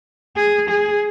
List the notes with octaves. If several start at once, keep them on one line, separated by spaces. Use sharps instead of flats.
G#4
G#4